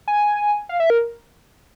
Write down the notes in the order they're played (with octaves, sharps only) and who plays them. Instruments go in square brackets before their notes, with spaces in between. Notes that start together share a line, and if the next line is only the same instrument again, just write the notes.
[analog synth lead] G#5
F5
E5
A#4